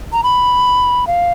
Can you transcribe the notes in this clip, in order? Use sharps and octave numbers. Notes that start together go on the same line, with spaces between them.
A#5
B5
F5